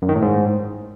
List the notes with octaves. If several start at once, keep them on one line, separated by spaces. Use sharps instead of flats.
F#2
D#3
A2
G#2